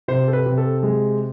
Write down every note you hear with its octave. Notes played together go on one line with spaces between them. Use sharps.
C3 C5
A4
B4
C3
A4
G#3